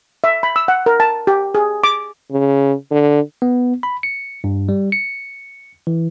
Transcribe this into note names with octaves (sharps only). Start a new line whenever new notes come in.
E5
B5
E6
F#5
A#4
A5
G4
G#4
D6
C#3
D3
B3
B5
C#7
G2
G3
C#7
E3